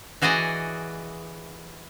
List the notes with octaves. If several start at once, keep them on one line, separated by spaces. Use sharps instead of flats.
E3 F#4 G#4 D5 D#5